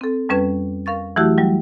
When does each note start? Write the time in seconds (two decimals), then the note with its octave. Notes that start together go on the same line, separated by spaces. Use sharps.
0.01 C4 A4
0.29 F2 G3 C#4 B4 G#6
0.86 A#4 F5 C#6 A6
1.16 E3 F#3 A3 E4 F#4 G4
1.38 F#3 G3